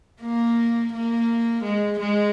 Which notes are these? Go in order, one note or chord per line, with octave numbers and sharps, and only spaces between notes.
A#3
A#3
G#3
G#3